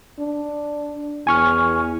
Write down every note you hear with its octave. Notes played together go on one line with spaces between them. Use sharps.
D4
E2 G#5 C#6 F6